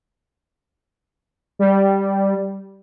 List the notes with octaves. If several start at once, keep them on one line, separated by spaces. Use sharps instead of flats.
G3